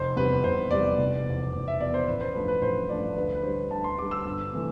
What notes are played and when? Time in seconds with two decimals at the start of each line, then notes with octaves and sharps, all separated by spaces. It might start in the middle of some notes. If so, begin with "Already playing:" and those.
Already playing: F1 C5
0.16 E2 C3 G3 B4
0.44 F1 C5
0.70 E2 C3 G3 D5
0.99 F1
1.26 E2 B2
1.53 F1
1.68 E5
1.80 E2 B2 D5
1.94 C5
2.07 A1 B4
2.21 C5
2.35 G2 F3 A3 B4
2.48 B4
2.62 A1 C5
2.89 G2 F3 A3 D5
3.16 D2 B4
3.35 B4
3.43 D3 G3 C5
3.70 D2 A5
3.84 C6
3.98 D3 G3 D6
4.11 E6
4.25 G1
4.53 C3 E3 A3